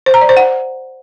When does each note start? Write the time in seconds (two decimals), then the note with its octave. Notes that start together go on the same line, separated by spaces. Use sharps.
0.06 C5
0.14 A#5
0.21 D5
0.29 C5
0.37 F#5